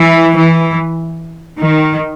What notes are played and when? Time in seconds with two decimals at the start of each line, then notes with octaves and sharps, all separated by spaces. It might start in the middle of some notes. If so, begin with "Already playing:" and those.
Already playing: E3
0.35 E3
1.59 D#3